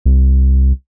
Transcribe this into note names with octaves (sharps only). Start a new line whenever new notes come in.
C2